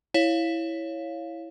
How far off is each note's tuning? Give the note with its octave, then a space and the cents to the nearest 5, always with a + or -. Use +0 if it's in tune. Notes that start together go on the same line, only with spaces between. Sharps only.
E4 +0 C#5 +0 F5 +0